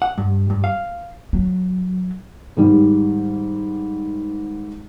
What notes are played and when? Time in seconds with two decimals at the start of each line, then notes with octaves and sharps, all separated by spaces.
0.02 F#5
0.18 G2
0.50 G2
0.64 F5
1.33 F#3
2.57 G#2 D#3 G3